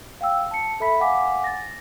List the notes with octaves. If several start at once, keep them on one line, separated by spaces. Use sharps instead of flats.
F5 G5 E6
A5 C#7
A4 E5 B5 B6
F5 F#5 G#5 D6 B6
A6 A#6